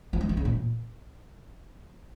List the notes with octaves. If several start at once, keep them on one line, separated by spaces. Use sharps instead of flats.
F3
G#3
D#3
C#3
A#2